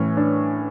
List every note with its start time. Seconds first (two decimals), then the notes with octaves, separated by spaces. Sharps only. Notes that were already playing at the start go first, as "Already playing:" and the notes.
Already playing: A2 E3 C#4
0.17 D4